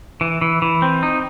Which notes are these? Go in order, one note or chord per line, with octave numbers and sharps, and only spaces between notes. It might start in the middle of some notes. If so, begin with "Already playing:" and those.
E3
E3
E3
C4
D#4